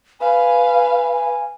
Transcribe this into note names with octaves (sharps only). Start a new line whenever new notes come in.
B4 F5 G#5
G#5